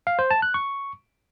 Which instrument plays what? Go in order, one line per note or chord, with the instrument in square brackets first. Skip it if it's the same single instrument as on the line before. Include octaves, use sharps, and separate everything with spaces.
[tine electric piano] F5
C5
A5
F#6
C#6